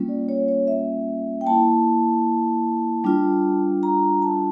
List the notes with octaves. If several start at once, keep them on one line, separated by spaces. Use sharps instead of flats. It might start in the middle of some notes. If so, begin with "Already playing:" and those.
Already playing: G3 A#3 C#4 F4
D5
C#5
C#5
E5
G5
A#3 E4 A5
G3 D4 F4
A#5
A5